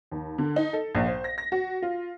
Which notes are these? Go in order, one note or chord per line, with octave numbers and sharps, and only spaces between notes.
D#2
D3
D#4
A4
A#1
C5
A#6
A#6
F#4
F4